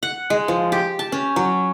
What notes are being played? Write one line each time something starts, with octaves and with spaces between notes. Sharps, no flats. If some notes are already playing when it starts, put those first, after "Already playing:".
F#5
G#3
F3
G4
A5
C#4
F#3